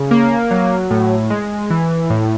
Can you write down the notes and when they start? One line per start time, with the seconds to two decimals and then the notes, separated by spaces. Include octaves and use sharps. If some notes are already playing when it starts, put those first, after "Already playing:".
Already playing: C#3
0.11 A#3
0.51 F#3
0.91 A2
1.30 G#3
1.70 E3
2.10 A2